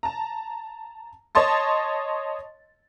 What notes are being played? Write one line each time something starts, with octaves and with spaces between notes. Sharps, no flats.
A5 A#5
C#5 D#5 A5 C6 A6